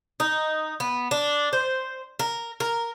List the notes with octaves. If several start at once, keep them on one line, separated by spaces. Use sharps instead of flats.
D#4
B3
D4
C5
A#4
A#4